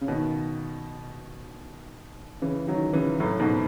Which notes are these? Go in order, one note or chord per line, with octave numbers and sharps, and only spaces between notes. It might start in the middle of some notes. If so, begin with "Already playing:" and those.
C#3
B2 D#3
C#3 E3
D#3 F#3
C#3 E3
F#2 A2
G#2 B2